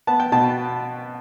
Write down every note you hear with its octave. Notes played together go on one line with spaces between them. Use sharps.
B3 A5
G5
B2 A5